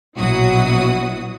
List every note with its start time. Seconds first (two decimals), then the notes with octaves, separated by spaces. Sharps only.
0.18 A#1 B2 F#3 E4 F#4 D#6